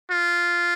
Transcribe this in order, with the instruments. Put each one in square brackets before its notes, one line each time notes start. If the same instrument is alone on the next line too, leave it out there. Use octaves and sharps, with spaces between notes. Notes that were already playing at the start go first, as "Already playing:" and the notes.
[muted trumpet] F4